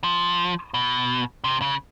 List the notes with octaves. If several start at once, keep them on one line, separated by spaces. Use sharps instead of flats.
F3
B2
C3
C#3